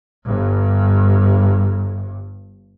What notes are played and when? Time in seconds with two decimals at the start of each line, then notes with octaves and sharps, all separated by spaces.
0.26 G1 G2